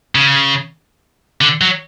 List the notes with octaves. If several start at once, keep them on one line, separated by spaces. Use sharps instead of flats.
C#3
D3
F#3